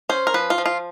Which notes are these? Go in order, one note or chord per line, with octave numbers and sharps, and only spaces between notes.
C#4 C5
A#4
F3 B4
F4
F3
F4